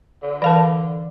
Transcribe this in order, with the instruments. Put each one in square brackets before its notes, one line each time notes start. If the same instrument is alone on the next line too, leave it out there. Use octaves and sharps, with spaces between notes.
[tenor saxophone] D3
[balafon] E3 A#4 B4 [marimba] D5 F5 A5